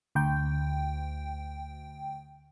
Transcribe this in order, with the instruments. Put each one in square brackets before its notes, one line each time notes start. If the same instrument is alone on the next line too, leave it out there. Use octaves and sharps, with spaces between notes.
[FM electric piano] D2 G5